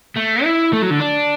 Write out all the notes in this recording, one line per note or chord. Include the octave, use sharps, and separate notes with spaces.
A3
E4
A3
F#3
D3
D4